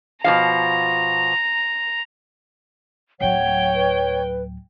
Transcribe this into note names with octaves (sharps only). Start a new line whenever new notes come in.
B2 F3 F5 A#5
D1 F#3 C#5 F#5 G5
B4